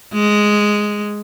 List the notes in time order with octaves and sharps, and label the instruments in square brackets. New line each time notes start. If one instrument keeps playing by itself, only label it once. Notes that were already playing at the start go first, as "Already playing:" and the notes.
[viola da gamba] G#3